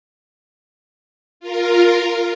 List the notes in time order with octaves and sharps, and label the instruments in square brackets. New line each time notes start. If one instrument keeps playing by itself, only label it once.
[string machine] F4 A#4